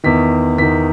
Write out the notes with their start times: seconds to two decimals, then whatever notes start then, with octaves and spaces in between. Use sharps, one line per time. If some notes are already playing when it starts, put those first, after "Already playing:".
0.04 E2 D#3 B6
0.58 E2 B6
0.62 D#3